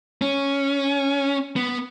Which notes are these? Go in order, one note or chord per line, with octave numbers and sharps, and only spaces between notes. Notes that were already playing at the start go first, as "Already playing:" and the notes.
C#4
B3